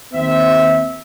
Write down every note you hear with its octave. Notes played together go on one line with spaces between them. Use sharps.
D#2 C4 E5